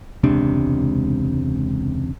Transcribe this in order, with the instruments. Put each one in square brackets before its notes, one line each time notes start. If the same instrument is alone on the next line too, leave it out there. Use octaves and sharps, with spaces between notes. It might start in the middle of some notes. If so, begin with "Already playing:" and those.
[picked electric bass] E1 C#2 C3 D4